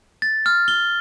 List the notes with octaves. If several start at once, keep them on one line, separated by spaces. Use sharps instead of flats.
A6
F6
G7